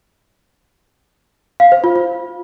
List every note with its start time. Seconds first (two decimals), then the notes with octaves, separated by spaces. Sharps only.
1.60 F5
1.72 C5
1.84 F4
1.96 F4